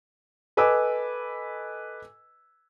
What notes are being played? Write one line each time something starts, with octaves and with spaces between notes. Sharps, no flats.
A4 B4 D#5 G#5 D6 E6